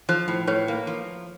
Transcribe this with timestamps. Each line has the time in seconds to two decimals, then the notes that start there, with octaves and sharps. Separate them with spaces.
0.09 F3 C5
0.28 A2
0.47 A2 B4 C#5
0.68 A#3
0.87 F3